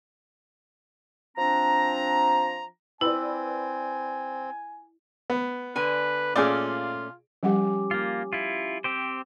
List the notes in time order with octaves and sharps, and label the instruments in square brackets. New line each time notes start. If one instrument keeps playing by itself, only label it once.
[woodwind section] F3 C4 D4 A#5
[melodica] C4 [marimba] E4 [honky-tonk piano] B4 D5 [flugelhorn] G#5
[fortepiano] B3
[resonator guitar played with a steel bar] D3 G#5 [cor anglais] B4
[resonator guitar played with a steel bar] A#2 A3 C#4 [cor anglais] F4 [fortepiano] G#4 D5
[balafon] F3 G3 F#5 [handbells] C#4 G4
[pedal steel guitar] A#3 F4
E4 F4
C4 G4 C5